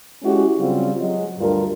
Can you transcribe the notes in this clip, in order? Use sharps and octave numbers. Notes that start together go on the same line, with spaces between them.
G#3 C#4 E4 F#4 G4
C#3 F#3 G3 C4 F4
F#3 G#3
D2 G2 D4 F4 A#4